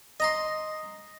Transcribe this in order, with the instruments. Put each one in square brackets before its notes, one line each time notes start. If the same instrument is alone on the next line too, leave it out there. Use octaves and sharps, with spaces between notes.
[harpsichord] D#5 A#5 C6